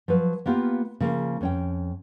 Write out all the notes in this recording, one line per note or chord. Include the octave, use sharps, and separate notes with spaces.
F3 F#3 B4
A#3 B3 F4 G4
C#3 F3 A#3 A#4
F2 C#4 G5